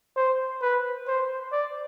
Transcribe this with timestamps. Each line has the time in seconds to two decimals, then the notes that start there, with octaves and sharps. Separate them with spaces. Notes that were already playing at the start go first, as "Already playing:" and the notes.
0.17 C5
0.62 B4
1.08 C5
1.52 D5